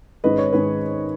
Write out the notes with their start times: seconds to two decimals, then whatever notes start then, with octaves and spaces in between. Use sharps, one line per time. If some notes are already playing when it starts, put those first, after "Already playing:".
0.24 G#2 D#3 G#3 C#4 B4 D#5
0.38 C#5
0.52 G#2 D#3 G#3 C#4 B4